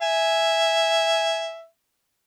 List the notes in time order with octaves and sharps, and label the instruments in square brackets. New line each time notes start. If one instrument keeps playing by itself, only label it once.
[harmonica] E5 [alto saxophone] G#5